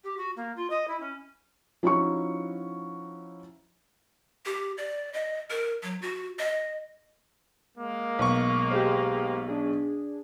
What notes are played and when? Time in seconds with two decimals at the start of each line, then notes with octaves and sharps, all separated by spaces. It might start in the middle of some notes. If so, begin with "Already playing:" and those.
0.04 G4
0.17 F#4
0.36 A#3
0.56 F4
0.70 D#5
0.88 E4
1.00 C#4
1.83 F3 C#4 D#4 E4 F#4 C#6
4.46 G4
4.78 D5
5.13 D#5
5.50 A#4
5.83 F#3
6.02 F#4
6.39 D#5
7.77 G#3 A#3
8.19 B1 C#6
8.71 G4 G#4 C5
9.48 D4 G#4